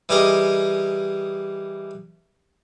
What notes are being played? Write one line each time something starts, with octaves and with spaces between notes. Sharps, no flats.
E3 G3 G4 G#4 A#4 D#5